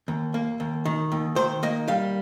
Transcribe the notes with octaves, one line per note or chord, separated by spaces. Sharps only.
D#2
A#3
D#2
D#3
D#2
D#3 C5
A#3 D#5
G3 F5